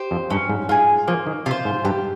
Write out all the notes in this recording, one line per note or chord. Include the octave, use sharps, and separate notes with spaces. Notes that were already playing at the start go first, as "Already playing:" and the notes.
Already playing: G4 C5
F2
G2 C#4
G#2
G#2 F4 G#4
F3 A#3
D#3
C3 F4 C5
G#2
G2 G4